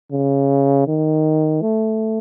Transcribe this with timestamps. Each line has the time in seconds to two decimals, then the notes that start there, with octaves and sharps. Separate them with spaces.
0.12 C#3
0.87 D#3
1.61 A3